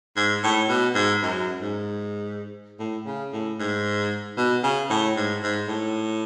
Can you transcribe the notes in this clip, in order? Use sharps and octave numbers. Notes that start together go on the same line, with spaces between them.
G#2
A2
B2
G#2
F#2
G#2
A2
C#3
A2
G#2
B2
C#3
A2
G#2
G#2
A2